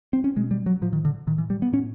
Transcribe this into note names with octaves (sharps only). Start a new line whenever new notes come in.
C4
C#4
B2 G#3
G3
F#3
A2 F3
D#3
D3
A2 D#3
E3
G3
B3
A2 C#4